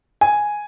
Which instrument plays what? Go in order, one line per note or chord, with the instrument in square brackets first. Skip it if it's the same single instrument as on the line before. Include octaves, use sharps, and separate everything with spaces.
[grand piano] G#5